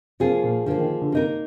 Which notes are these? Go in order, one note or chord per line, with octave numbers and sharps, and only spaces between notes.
C3 F3 A#3 F4 G#4
A#2
D3 F3 A#3 F4 G#4
D#3
D3
C3 A#3 D#4 A#4